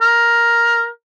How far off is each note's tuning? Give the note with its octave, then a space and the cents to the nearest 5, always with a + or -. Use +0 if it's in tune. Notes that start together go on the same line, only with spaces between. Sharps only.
A#4 +5